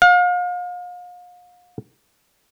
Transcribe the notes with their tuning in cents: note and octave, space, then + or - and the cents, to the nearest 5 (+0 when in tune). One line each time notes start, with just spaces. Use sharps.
F5 +40